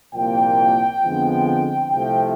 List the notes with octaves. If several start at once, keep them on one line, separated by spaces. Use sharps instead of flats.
C2 A#2 F3 A#3 G5
F2 D3 F3 G#3 B3
C2 C3 F3 A3 G5